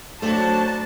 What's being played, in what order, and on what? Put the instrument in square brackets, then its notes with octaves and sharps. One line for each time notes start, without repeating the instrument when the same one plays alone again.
[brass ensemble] F#3 D4 [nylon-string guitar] A3 [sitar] F#4 C5 [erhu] A5